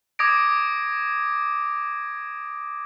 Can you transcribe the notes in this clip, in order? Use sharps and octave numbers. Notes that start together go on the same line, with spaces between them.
D6 D#6 G#6 A#6 D7